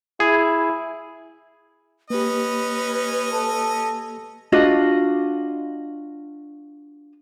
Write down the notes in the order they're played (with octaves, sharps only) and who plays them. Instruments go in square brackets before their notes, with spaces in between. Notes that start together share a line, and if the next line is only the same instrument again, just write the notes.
[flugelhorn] E4 [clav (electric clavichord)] G#4
[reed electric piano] A#3 G4 [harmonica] C#4 D#5 [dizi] B4
[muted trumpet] A4
[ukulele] D4 F4 F#4 D#5